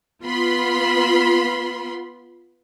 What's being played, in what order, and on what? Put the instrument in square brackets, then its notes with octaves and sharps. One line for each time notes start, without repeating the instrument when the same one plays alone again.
[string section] B3 F4 B5 C6